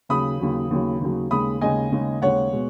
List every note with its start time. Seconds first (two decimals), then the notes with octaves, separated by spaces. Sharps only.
0.09 D#2 C#3 F#3 B5 D#6
0.40 D#2 C#3 F#3
0.71 D#2 C#3 F#3
1.01 D#2 C#3 F#3
1.31 D#2 C#3 G#3 B5 D#6
1.61 D#2 C#3 G#3 D#5 G#5
1.92 D#2 C#3 G#3
2.22 D#2 C#3 G#3 C#5 F#5
2.52 B2 G#3